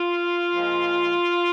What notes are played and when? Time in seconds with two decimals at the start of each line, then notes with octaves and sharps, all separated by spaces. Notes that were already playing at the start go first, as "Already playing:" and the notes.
Already playing: F4
0.54 A#2 F3 G#3